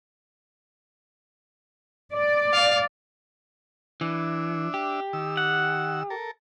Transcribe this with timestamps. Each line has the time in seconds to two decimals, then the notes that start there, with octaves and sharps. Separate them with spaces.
2.14 D5
2.54 F5
4.01 E3 D4 E5
4.74 G4
5.13 D#3 E6
5.37 F#5
6.10 A4 A#4